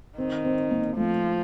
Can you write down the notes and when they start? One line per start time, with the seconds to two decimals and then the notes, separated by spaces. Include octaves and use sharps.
0.18 D#3 C4
0.45 C4
0.71 A#3
0.97 F3 A3